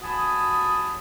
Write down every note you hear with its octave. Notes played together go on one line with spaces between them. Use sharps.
F#4 G#5 A5 B5 D#6